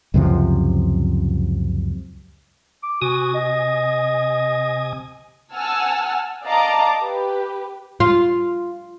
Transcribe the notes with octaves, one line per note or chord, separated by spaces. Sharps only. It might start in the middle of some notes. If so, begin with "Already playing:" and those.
C#2 F#2 C3 F3
D6
C3 F#4 G#5 D#6
D#5
F#5 G#5 A5 E6 F6
D5 D#5 F5 A5 A#5 D6
G4 B4
F4